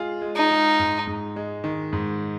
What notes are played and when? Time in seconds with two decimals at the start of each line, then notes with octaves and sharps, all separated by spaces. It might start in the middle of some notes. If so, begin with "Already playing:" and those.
Already playing: G#3 F4 G#4
0.22 G#3
0.36 D#4
0.51 G#3
0.79 G#2
1.07 G#2
1.36 G#3
1.64 D#3
1.93 G#2